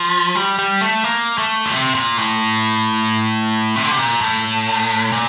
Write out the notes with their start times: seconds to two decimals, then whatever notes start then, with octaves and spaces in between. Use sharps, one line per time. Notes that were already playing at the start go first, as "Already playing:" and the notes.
Already playing: F3
0.35 G3
0.59 G3
0.81 A3
1.04 A#3
1.38 A3
1.66 A#2
1.72 C3
1.95 A#2
2.18 A2
3.76 C3
3.83 D3
3.91 C3
3.99 A#2
4.21 A2
5.12 A#2